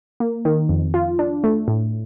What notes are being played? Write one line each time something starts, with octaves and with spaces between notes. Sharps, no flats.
A#3
D#3
F2
F4
D4
A3
A2